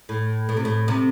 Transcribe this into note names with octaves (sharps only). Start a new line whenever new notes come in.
A2
A2
C3
A2
C3